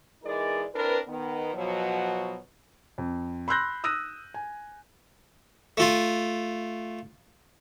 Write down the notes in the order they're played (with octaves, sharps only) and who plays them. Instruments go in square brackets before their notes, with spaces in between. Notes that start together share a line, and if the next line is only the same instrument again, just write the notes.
[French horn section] E3 G#3 D#4 G#4 A#4 D5
C4 D4 E4 A#4 B4
D#3 B3
B2 F3 F#3
[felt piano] F2
B5 C6 E6 F#6 G6 A#6
D#6 E6 F#6 A#6 D#7
G#5
[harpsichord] A3 F4